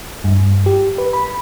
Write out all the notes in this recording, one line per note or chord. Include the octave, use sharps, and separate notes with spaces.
G2
G4
B4
B5